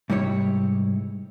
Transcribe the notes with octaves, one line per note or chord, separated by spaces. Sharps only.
G#2 C3 G3 E4 C#5